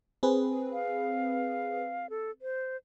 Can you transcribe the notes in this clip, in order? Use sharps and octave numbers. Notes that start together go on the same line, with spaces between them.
C4 G#4 B4
F5
A4
C5